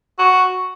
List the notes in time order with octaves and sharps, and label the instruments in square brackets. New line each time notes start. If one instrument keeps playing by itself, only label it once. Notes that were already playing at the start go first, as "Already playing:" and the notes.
[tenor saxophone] F#4